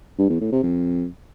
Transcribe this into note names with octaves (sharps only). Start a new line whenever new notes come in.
G2
E2
A2
C3
F2